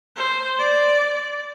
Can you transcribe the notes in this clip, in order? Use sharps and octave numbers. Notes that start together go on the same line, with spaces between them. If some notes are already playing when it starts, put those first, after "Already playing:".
C5
D5